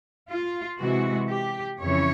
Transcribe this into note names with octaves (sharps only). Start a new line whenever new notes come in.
F4
C3 E3 G#3 F#4
G4
F2 C#3 E3 C#5